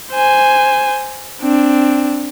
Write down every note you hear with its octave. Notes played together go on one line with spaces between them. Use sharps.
C5 G#5
C4 D4